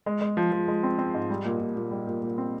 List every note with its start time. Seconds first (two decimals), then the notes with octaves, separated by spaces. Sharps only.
0.06 G#3
0.21 G#3
0.37 F3
0.52 F3
0.68 G#3
0.83 C4
0.98 C4
1.14 G#2
1.30 G3
1.45 A#2
1.60 A#2
1.76 A#2
1.91 G3
2.07 A#2
2.22 A#2
2.38 C4